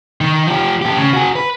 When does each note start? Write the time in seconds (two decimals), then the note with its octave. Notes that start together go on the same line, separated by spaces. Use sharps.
0.21 D#3
0.47 F3 G4
0.82 A2 G4
0.97 C#3
1.13 F#4 G#4
1.36 B4